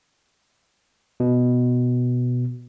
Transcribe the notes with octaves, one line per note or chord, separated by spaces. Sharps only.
B2